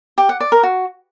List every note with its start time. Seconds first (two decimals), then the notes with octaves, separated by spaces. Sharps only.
0.18 G4
0.29 F#5
0.40 D5
0.52 A#4
0.63 F#4